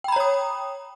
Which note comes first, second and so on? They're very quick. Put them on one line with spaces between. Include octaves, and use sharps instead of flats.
G5 B5 A#5 C#5 D#6